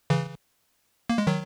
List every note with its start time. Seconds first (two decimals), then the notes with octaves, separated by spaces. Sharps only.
0.10 C#3 E3
1.10 A#3
1.18 G#3
1.27 D#3 F#3